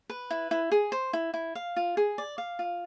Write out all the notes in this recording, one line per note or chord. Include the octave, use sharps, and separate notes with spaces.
B4
E4
E4
G#4
C5
E4
E4
F5
F4
G#4
D5
F5
F4